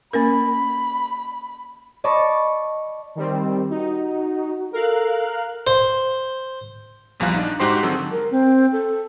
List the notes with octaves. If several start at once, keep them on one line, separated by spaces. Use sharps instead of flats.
A#3 C#4 A#4 B5
D5 D#5 A5 B5 C#6 D6
D#3 G3 C4
D#4 F#4
A4 A#4 F5 F#6
C5
A#1 E2 F3 G3 F5 F#6
D4 D#4
G#2 D#4 F#4 G4 C5 C6
D3 D#3 F#3 C4 G#4 A4
A#4
C4
A4